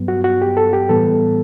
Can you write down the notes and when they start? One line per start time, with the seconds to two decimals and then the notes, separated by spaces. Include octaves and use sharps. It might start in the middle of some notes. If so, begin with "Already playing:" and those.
Already playing: G2 F#3 B3
0.08 F#4
0.24 F#4
0.42 G4
0.57 A4
0.73 G4
0.89 A2 E3 G3 B3 A4